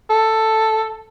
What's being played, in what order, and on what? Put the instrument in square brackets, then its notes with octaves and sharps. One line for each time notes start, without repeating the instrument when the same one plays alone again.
[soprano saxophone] A4